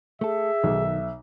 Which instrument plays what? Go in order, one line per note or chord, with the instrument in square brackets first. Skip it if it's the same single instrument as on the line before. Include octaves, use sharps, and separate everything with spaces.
[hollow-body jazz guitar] A3 A4 [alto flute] G#4 [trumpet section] E5
[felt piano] B1 [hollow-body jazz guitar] D#3